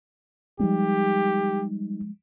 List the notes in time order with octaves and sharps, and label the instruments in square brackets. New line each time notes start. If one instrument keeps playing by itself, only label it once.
[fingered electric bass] F3 G#3 [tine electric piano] G3 D#4 [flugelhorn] G4